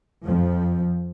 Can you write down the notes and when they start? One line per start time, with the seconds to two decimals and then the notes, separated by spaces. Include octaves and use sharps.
0.23 F2 F3